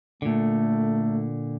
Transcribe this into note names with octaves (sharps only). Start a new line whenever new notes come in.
A#2 D3 A3